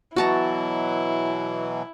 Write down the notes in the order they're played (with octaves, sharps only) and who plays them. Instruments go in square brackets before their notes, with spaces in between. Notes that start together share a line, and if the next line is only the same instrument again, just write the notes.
[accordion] B2 E3 F#3 [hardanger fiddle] E4 [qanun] F#4 A5 A#5